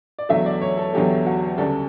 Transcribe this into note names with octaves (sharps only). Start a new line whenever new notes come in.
D5
E2 D3 F#3 A3 E5
D5
C#5
A4
E2 D3 F#3 A3 G4
F#4
D2 C#3 G3 A4